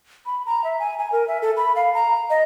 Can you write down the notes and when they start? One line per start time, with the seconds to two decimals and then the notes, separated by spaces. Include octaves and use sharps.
0.26 B5
0.46 A#5
0.64 E5
0.79 G#5
0.99 G#5
1.12 A#4
1.28 E5
1.42 A4
1.57 B5
1.76 F5
1.94 A#5
2.30 D#5